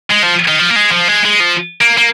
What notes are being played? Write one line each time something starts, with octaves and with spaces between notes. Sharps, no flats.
G#3
F3
D#3
F3
A#3
G#3
F3
G#3
G#3
F3
A#3
A#3